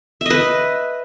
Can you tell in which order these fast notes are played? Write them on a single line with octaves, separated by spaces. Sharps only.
E5 D#5 B4